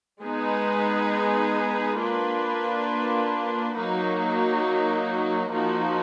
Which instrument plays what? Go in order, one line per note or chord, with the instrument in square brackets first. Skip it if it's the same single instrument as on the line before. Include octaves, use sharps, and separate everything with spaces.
[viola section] G#3 B3 D#4 G#4 B4
A#3 D4 F4 B4
F#3 A#3 D#4 F#4
F3 A#3 D#4 F#4